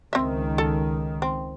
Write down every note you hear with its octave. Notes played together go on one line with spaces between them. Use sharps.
C#2 D#3 C4 E5
A4
C4